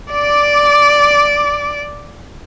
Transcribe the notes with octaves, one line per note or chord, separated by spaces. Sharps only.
D5 D6